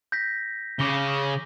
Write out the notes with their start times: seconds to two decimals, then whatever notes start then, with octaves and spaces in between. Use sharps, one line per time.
0.12 G6 A#6 B6
0.79 C#3 D6 A#6 G7